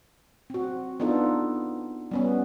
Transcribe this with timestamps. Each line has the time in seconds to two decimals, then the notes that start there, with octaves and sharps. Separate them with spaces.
0.50 C4 F#4
1.00 B3 D4 D#4 F4 A4
2.11 G3 B3 C#4